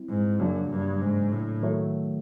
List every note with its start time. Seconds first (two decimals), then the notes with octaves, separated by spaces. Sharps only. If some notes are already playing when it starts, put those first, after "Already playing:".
Already playing: G3 C4 E4
0.09 G#2
0.40 F#2 C#3 F#3 A#3 D4
0.71 G2
1.01 G#2
1.32 A2
1.62 D#3 F#3 A3